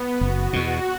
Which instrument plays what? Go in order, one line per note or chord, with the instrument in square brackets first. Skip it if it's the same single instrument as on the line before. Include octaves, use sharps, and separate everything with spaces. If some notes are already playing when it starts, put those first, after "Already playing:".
Already playing: [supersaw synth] B3
[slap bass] F#1 [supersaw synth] F#4
[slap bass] E2 B2